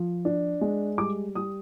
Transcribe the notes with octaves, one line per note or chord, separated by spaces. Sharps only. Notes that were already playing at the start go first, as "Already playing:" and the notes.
Already playing: F3
D4
G#3
G3 D6
G3 D#6